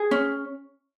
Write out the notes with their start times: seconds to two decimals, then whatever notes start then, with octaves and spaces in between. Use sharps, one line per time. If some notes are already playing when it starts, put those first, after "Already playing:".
Already playing: G#4
0.11 C#4